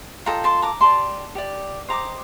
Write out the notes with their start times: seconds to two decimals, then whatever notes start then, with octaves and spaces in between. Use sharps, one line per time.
0.26 F4 A4 D#5 G5 A#5
0.44 A5 C6
0.62 A#5 D6
0.81 G4 D5 A5 C6
1.35 G4 D5
1.88 G4 C5 D#5 A#5 D6